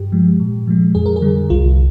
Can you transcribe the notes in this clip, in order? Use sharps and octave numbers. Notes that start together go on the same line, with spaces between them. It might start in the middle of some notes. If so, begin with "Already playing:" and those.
Already playing: G2 G4
F3 G#3
A#2
F3 G#3
F2 G#4
A#4
G#4
D3 G3
C2 F4